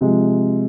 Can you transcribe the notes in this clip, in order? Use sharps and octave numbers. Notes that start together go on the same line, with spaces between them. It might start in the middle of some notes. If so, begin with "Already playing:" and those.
C3 F3 G#3